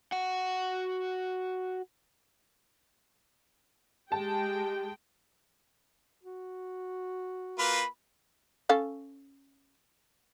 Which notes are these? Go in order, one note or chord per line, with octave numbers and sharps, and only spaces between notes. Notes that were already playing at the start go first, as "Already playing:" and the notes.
F#4 F#5
G#3 G4 G5 A5
F#4
A#3 F4 B4 B5
C#4 A4 F5